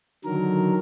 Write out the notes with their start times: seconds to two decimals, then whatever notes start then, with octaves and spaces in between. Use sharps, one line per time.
0.25 D3 D#3 F#3 A#4